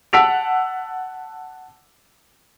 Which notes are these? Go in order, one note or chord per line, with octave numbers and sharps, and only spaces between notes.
F#5 A5 E6 B6 D7 F7